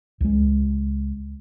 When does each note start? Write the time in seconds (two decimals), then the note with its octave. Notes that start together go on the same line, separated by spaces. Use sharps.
0.21 C#2 G#3